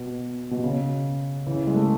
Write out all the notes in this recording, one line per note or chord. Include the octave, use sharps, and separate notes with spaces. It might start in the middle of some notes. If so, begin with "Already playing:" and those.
Already playing: B2
B2
C#3
C#3 E3
G#3
A3